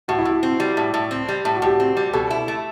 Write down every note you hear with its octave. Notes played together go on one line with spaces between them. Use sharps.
A2 F#4
E4
A2 F#4
C4
G3
A2
A2
C4
G3
A2
F#4
A2 G4
C4
G3
G4
B2 A4
E4
A3